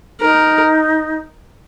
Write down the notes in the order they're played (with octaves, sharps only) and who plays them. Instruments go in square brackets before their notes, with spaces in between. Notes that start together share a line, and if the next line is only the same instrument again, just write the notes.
[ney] D#4 [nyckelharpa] A#4